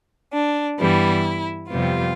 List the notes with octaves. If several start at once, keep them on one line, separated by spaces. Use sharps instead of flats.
D4
G2 E3 G3 B3 E4
F2 C3 G3 B3 F4